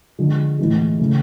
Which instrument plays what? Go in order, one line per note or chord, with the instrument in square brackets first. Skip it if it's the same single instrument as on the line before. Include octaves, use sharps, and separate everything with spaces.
[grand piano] D3 F3 G#3
A2 E3 G#3
C#3 E3 A3